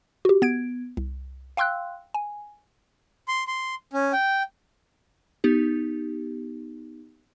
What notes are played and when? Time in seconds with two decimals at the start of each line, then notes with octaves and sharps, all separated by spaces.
0.25 F#4 G4
0.42 B3 G#6 D7
0.97 C2
1.57 F5 G5 C6 E6 F#6
2.14 G#5
3.28 C6
3.47 C6
3.93 C#4
4.13 G5
5.44 B3 D#4 G4